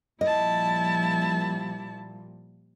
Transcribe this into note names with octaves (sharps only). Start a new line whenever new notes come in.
A#2 F3 G3 E4 D#5 A5